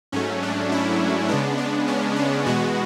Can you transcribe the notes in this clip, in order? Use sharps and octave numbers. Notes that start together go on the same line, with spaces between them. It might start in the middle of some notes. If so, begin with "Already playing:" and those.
G#2 F#3 A3 C#4
D4
E4
C#3 G#3 B3 D4
D4
C#4
D4
E2 B2 G#3 B3 F#4